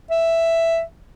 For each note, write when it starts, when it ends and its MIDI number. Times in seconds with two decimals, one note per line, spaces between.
0.11 0.81 76